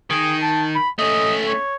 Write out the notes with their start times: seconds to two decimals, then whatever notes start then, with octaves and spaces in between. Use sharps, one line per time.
0.10 D#3 G#4
0.42 A5
0.75 B5
0.99 A3 C#4 D#5
1.47 C#5